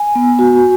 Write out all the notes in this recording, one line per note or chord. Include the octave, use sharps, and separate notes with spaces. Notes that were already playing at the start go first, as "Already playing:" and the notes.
Already playing: G#5
B3
F#4